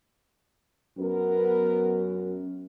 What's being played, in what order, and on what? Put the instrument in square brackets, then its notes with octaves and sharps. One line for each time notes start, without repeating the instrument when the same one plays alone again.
[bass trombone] F#2 [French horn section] B3 A#4